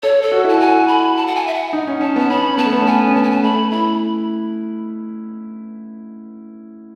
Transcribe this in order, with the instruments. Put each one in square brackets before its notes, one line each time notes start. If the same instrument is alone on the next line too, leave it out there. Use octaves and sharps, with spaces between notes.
[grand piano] A4 [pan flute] C#5
[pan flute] A4
[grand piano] F#4
[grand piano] E4 [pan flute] A5
[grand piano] F#4 [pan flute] G#5
[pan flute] B5
A5
F#5
G#5
E5
F#5
[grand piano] D#4
C#4
[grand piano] C#4 [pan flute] A5
[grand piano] B3 [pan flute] A5
[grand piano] C#4 [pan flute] B5
[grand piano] B3 [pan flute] A5
[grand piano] A3
B3
C#4
[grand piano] B3 [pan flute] G#5
[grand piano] C#4
[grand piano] B3 [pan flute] A5
[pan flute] G#5
A5
[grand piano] A3 [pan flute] B5
[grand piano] E4 [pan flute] B5